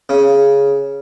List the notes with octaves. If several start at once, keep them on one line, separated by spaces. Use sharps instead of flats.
C#3